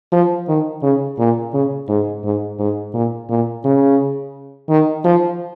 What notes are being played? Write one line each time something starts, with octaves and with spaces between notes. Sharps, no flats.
F3
D#3
C#3
A#2
C#3
G#2
G#2
G#2
A#2
A#2
C#3
D#3
F3